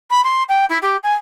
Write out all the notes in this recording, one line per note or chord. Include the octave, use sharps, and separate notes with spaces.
B5
C6
G5
E4
G4
G#5